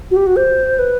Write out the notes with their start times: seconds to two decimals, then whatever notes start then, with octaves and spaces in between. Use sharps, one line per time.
0.11 F#4
0.16 G4
0.27 F#4
0.36 C5
0.79 B4